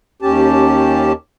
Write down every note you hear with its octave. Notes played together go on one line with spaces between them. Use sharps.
D#2 C#4 G4 A5